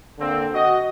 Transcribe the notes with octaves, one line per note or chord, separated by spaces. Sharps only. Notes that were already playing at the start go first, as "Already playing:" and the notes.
D3 A#3 C4
F#4 D#5